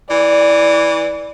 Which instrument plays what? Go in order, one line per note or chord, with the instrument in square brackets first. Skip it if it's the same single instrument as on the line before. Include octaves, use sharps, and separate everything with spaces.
[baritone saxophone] E3 [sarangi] D5